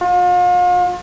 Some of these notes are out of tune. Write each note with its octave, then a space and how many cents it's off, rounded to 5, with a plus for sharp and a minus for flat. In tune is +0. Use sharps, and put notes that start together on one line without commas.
F4 +40